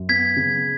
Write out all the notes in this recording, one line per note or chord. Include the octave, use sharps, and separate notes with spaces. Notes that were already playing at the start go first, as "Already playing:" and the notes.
Already playing: F#2
B3 G#6 B6
C#3